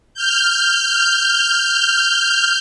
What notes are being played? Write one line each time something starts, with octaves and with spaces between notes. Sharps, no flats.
F6 G6